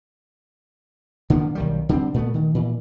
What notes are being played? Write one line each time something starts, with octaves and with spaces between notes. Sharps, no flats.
D3 D#3 A#3 B3
B1 D#3 G3
D3 G3 A#3 C4
A#2 A3 B3
D#3
A#2 E3